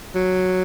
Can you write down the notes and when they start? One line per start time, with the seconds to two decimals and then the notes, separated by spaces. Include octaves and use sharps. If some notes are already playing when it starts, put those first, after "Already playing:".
0.16 F#3